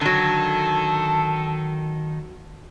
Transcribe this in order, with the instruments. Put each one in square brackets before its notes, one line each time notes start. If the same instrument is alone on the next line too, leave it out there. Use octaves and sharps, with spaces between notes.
[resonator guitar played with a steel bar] D3 F#3 [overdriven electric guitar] D#3 [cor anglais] A4